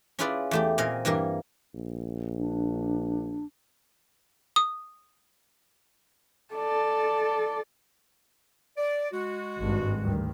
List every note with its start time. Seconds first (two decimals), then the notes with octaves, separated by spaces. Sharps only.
0.19 C#4 E4 F4 G#4 B4 D5
0.51 E2 A3 G4
0.78 A#2 C4 D#5 F5 G#5
1.05 G2 E3 G3 A#3 A#4
1.75 A#1
2.39 D4
4.56 D#6
6.54 A4 D5
8.77 D5
9.12 G#3 F#4
9.59 G#1 G2
10.02 D2 G2 D#3